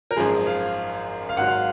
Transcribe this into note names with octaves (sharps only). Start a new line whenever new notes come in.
A#4
G#1 F#2 F3 G#3 G#4
F5
F5
G#1 G#2 F#3 F#5
F5